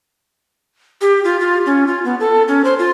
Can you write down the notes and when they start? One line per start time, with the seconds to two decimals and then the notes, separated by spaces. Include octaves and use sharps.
1.01 G4
1.24 F4
1.40 F4
1.66 C#4
1.87 F4
2.05 B3
2.20 A4
2.48 C#4
2.64 C5
2.79 F4